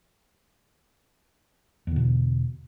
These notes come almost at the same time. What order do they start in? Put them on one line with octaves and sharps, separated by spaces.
E2 D3 B2